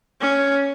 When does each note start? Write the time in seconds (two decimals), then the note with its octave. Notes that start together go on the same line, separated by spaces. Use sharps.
0.21 C#4